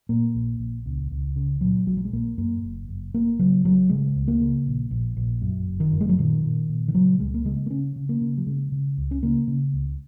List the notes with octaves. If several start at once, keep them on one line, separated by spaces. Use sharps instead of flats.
A#2 A#3
A#1
A#1
C#2
C#2
C#3
A#2 F#3
A#1 F#3
F#3
G#3
A#1 A#3
F#2 A#3
F#1
F#1
G#1 A#3
C#3 F#3
G#1 F#3
C#3 G#3
C#2
A#3
C#3
A#1
A#1
A#1
F#2
F#1
D#3
F#2
G#3
F#3
A#2 D#3
A#2
A#2
D#3
C#3 F#3
C#2 G#3
A#3
C#3 G#3
A#3
C#3 C#4
C#3
A#3
C#3
F#3
C#3 G#3
C#3
C#2
C#4
C#3 A#3
C#3
C#2